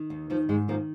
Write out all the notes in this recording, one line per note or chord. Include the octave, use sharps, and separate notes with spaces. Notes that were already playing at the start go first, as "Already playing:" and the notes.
Already playing: D#3
D#2
D#3 F3
G#2 G#3
D#3 F3 A#3